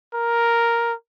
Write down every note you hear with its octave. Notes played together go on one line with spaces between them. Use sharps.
A#4